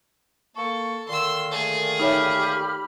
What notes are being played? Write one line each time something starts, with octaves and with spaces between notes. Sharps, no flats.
A#3 A4 C#6
A#2 D3 D#3 C6 E6
A3 G#4
D#4 G4 C#5 E5 B5 F6